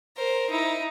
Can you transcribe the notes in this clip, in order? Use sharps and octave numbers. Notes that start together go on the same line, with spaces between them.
A#4 C5
D#4 E4